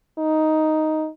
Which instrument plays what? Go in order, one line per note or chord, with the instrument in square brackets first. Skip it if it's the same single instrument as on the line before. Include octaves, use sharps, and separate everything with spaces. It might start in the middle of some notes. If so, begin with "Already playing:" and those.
[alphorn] D#4